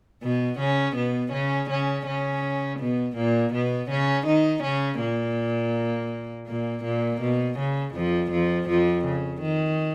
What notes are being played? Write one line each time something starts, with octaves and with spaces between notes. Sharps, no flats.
B2 B3
C#3 C#4
B2 B3
C#3 C#4
C#3 C#4
C#3 C#4
B2 B3
A#2 A#3
B2 B3
C#3 C#4
D#3 D#4
C#3 C#4
A#2 A#3
A#2 A#3
A#2 A#3
B2
C#3
F2 F3
F2 F3
F2 F3
C#3
D#3